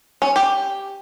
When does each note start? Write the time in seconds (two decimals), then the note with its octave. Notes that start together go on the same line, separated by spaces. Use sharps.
0.22 C#4
0.36 G4